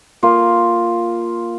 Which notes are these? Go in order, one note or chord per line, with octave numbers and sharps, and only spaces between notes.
A#3 F4